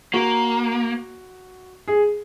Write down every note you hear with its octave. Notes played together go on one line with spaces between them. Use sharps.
A#3 F#4
G#4